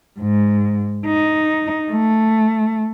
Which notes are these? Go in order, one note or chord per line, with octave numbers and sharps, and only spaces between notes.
G#2
D#4
A3